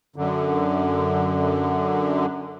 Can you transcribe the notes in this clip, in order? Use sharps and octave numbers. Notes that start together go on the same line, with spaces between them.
F#2 D3